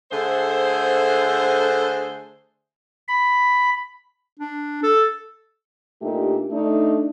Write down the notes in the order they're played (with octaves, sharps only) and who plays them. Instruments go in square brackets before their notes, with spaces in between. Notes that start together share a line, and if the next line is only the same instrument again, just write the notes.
[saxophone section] D3 A3 G#4 C5
[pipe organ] B5
[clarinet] D4
A4
[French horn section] A#2 A3 D4 D#4 G4
A3 D4 D#4